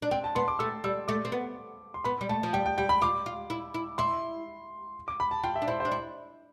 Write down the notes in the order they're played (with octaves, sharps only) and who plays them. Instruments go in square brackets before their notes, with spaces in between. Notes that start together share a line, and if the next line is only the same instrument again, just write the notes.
[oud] D4
[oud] C4 [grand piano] G5
[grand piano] A5
[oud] B3 [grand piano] C6
[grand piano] D6
[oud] A3 [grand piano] E6
[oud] G3 [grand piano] E6
[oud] A3 [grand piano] D6
[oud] C4
B3
[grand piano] C6
[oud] B3 [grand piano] B5
[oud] G3
[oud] A3 [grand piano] A5
[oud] F3
[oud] G3 [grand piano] G5
[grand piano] G5
[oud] G3 [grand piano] G5
[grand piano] B5
[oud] F4 [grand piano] D6
[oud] F4
E4
E4
[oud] E4 [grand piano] C6
[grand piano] D6
B5
A5
[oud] F4 [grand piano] G5
[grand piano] E5
[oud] D4
[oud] E4 [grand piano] C5
[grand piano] C5
[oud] D4
E4